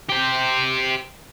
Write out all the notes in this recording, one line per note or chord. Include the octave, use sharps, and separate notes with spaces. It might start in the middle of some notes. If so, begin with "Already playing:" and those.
G4 C5